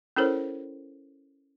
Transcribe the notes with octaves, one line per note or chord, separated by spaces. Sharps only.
C#4 E4 A4 A#4 C5 C#5